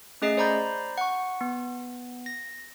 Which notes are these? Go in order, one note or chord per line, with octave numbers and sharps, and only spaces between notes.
A3 C#4 G#4 D#5 C7
C5 D5 A#5 B5 G6
F#5 C#6
B3
A#6